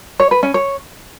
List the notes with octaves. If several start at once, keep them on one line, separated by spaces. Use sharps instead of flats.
C#5
B4
C#4
C#5